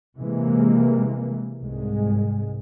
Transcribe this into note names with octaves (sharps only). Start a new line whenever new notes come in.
C3 E3 G#3 A#3
C2 G#2 G#3